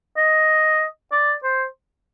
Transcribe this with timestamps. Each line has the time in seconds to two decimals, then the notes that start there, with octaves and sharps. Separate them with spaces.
0.17 D#5
1.12 D5
1.43 C5